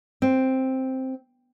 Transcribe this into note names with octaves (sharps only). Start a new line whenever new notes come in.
C4